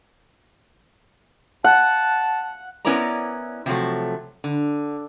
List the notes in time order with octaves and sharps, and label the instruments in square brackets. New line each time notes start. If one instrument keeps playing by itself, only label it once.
[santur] F#5 [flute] A5
[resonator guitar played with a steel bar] B3 C#4 E4 A#4 D5 A#5
C3 F3 F#3 A3
D3